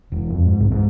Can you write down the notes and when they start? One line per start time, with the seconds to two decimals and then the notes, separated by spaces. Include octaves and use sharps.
0.12 E1
0.30 F2
0.45 G#2
0.60 C2
0.72 G#2